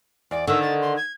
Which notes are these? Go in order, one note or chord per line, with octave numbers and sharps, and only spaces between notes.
E2 D5
D3 D#3 E6
A6
C6
G#6